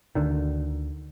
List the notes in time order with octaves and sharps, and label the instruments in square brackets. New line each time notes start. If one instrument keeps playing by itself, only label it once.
[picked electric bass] D2 D3 D#3